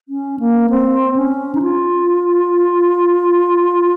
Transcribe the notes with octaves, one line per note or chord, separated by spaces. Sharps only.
C#4
A#3
C4
C#4
D#4
F4